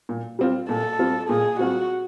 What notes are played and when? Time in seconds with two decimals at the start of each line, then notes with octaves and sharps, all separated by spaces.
0.09 A#2
0.39 G3 C4 F4
0.69 A#2 A4
0.99 G3 C4 F4
1.29 A#2 G#4
1.59 G3 C4 F4 F#4